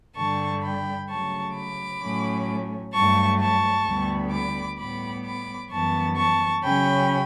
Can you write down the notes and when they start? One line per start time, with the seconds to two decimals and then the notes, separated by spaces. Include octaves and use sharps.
0.16 G2 D3 G3 A5 C#6
0.63 G5 B5
1.09 C#3 F#3 A3 A5 C#6
1.56 B5 D6
2.02 A2 F#3 A3 C#4
2.93 G2 F#3 A3 A5 C#6
3.40 A5 C#6
3.86 D2 D3 G3 B3
4.32 B5 D6
4.78 A2 G3 B3 B5 D6
5.25 B5 D6
5.70 F#2 E3 G3 B3 A5 C#6
6.17 A5 C#6
6.63 C#3 F#3 C#4 G5 B5